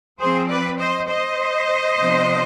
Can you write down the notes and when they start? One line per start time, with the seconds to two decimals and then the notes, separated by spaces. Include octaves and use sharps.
0.18 F3 C4 G#4 C5
0.48 B4 D5
0.79 C5 D#5
1.07 C5 D#5
1.97 C3 F3 B3 D4